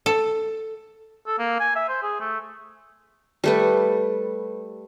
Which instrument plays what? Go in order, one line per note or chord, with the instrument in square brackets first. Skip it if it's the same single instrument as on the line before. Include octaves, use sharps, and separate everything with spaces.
[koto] A4
[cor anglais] A4
A#3
G#5
E5
C5
G#4
A3
[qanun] G3 A3 B4